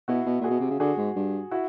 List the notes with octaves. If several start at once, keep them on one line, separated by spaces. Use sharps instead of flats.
B2 E4 F#4
B2
A#2 F#4 G#4
B2
C3
C#3
D3 F#4 G#4
G#2
G2
E4 F#4